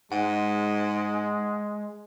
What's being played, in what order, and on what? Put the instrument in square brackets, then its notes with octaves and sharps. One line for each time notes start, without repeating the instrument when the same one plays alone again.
[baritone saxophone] G#2 [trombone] G#3 [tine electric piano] F#5